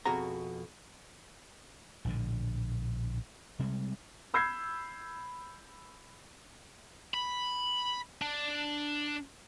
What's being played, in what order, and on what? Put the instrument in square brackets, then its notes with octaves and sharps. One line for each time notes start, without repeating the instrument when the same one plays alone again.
[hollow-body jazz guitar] F2 B2 F#4 G#4 A#5
[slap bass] A#1 A2 D3
C3 G3 G#3
[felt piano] B5 E6 G6 G#6 C7
[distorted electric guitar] B5
D4